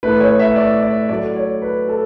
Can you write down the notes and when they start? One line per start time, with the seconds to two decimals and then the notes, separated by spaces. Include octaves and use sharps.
0.03 A2 E3 A3 B4
0.21 C#5
0.39 E5
0.56 D5
0.83 D5
1.09 A2 F#3 A3 D5
1.36 C#5
1.62 B4
1.88 A4